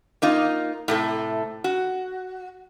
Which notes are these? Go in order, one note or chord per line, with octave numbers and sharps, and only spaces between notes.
A#3 D#4 F4
A2 C3 A3
F#4